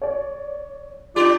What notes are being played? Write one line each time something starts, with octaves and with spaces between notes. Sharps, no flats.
C#5 D5
D4 F4 G4 D5